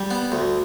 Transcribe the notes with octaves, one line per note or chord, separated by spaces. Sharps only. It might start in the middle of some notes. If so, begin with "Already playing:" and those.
Already playing: G3
B3
D2